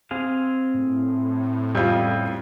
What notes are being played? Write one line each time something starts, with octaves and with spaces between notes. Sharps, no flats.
C4 G#4 F5
A2
F2 C#3 G3 F4